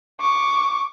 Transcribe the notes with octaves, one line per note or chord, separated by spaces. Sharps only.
C#6 D6